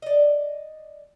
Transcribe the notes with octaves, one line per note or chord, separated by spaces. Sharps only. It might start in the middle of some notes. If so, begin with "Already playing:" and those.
D5 D#5